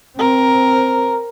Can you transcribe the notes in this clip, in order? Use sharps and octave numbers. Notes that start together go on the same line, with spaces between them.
C4 A#4